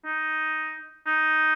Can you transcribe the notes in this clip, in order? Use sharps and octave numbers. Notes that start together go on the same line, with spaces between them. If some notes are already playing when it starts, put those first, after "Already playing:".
D#4
D#4